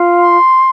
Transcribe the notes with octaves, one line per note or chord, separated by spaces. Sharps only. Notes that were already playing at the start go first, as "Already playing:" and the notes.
Already playing: F4
C6